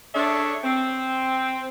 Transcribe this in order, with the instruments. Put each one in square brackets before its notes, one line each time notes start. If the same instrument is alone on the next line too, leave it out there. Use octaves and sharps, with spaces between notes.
[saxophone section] D4 G#4 A4 C#5 D5 E5
C4